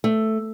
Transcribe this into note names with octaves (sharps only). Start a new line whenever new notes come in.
A3